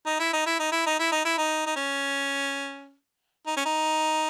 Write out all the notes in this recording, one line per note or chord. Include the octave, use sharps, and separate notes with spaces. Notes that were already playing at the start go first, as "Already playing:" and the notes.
D#4
E4
D#4
E4
D#4
E4
D#4
E4
D#4
E4
D#4
D#4
C#4
D#4
C#4
D#4